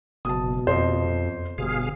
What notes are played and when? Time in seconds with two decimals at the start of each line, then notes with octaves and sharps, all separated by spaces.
0.25 F#1 B2 A5 D#6
0.67 F2 C5 D#5
1.58 G1 B2 G#4 F5